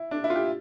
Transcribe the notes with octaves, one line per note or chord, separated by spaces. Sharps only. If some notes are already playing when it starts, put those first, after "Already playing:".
Already playing: E4
D4
E4
F4
G4